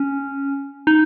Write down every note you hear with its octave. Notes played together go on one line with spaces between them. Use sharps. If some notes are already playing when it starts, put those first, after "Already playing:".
Already playing: C#4
D#4